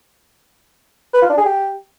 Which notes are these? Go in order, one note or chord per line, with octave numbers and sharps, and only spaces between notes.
B4
F4
D4
G#4
G4